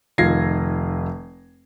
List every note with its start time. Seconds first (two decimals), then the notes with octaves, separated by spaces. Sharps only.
0.18 F1 D#3 F4 G#6 A#6 C7